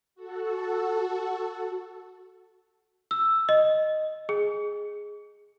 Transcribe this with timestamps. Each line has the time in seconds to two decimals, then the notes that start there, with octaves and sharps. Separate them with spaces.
0.15 F#4 A4
3.11 E6
3.49 D#5
4.29 G#4